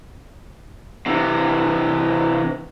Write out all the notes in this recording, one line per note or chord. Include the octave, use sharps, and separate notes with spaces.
C3 E3